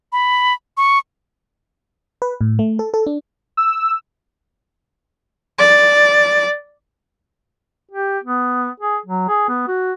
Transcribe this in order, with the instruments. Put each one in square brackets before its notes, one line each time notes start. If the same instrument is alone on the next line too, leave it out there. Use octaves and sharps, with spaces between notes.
[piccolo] B5
C#6
[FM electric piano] B4
A2
A3
A4
A4
D4
[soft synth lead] E6
[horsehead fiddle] D5
[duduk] G4
B3
G#4
F#3
G#4
B3
F#4